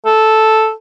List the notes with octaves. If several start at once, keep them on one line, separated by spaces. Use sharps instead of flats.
A4